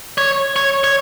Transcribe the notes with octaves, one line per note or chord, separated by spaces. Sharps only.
C#5
C#5
C#5